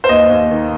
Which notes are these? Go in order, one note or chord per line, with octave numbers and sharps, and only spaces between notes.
C5
D#2 D#5
D#2
D#3